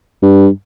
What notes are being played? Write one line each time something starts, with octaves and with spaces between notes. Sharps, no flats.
G2